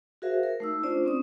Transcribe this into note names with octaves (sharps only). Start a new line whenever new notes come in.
F#4 G#4 A#4 C5 E5 F5
A#4
A3 D#4 E6
C#4 D4 F4 C5 D5
C4 C#4 D#6